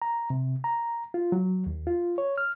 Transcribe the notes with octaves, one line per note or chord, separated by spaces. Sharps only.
A#5
C3
A#5
F4
F#3
D#2
F4
C#5
F6